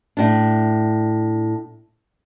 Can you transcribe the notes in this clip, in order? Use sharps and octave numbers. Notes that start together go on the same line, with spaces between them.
A2 D4